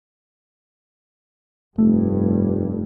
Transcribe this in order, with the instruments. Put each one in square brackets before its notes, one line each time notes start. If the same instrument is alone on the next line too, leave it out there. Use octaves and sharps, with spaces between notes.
[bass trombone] F1 [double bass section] G2 [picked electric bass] A3